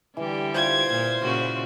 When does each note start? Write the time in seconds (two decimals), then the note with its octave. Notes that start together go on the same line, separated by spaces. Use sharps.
0.17 D3 E3 G3 G4
0.55 E4 F4 C5 B5 G#6
0.89 A#2
1.22 A#2 C#3 F#4